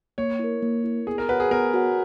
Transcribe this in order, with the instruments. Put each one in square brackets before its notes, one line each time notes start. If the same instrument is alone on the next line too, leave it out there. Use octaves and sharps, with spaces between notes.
[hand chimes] A#3 [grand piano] C#5
[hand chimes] E4 A#4
A#3
E4 A#4
[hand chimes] B3 [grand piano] G#4
[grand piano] A#4
[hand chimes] F#4 C#5 F#5 [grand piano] B4
[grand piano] G#4
[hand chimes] B3 [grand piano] A#4
[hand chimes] F#4 C#5 F#5